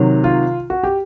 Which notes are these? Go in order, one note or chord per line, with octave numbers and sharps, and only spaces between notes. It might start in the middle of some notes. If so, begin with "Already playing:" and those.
Already playing: C3 D#3 F#3
F4
F#4
G4